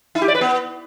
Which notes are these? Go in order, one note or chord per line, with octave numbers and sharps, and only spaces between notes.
E4
G4
D5
B4
B3